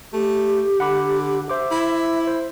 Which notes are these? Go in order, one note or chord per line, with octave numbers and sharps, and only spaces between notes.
A3 G4
D3 F#5 B5 D6
C5 E5 D6
E4
C5